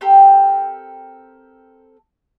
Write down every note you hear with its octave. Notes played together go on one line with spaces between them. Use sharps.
C4 G4 A4 A#4